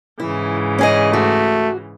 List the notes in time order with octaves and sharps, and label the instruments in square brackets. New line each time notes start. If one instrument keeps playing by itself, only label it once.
[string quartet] G#2 C#3 E3 [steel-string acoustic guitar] E4
[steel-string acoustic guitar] C#4 G#4 D#5
[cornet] A3 [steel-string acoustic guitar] F#4